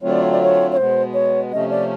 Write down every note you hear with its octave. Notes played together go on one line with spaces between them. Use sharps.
D3 F#3 A3 C4 F4 C#5
D5
C#5
D5
C#5
C#5
B2 G#3 B3 C5
C#5
C3 F3 A3 C#4 D#5
D5